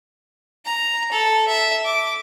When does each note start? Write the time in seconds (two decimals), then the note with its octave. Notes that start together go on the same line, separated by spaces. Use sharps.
0.66 A#5
1.12 A4
1.48 E5
1.85 D6